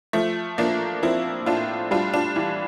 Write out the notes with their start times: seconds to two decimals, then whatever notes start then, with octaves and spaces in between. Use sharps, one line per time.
0.13 F3 A3
0.58 F3 A#3 D4
1.03 F3 C4 E4
1.46 A2 D4 F4
1.91 G3 D4 F4
2.14 D4 F4
2.36 E3